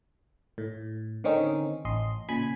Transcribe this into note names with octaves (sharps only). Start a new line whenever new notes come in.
A2
D3 D#3 C4 C#4 D#4
A1 D#5 C6
A#2 C#3 G#5 B5 G#6